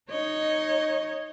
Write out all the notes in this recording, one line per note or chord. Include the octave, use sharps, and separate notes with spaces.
D#4 C#5 D#5